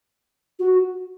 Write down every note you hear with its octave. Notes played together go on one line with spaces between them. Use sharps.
F#4